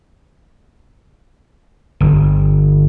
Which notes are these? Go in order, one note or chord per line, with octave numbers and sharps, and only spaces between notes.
G1